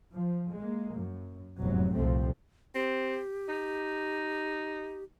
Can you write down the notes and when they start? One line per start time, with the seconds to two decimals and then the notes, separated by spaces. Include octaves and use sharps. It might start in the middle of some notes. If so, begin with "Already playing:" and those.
0.13 F3
0.56 G#3 A#3
0.97 F#2
1.58 F1 E2 G#2 F#3
1.93 C2 F2 A#2 F3 A3 C4
2.75 C4 G4
3.48 D#4